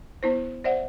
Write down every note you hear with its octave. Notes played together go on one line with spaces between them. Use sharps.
B3 E4 C5
C5 D5 E5 F#5